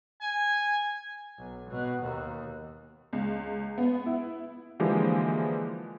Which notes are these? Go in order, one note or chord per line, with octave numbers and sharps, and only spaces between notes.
G#5
B1
B2
D#2
C#2
B3
E4
D3 E3 F3 G#3 A#3 G4